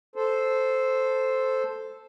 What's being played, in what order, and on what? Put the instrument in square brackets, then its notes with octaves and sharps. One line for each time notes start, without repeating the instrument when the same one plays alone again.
[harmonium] A4 C5